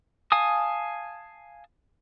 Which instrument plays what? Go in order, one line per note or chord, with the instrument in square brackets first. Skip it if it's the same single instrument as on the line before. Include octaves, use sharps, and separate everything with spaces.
[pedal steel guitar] F5 G#5 A5 D#6